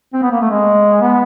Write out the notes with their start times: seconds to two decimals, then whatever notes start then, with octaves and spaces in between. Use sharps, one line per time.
0.14 C4
0.23 B3
0.31 A#3
0.41 A3
0.50 G#3
1.01 B3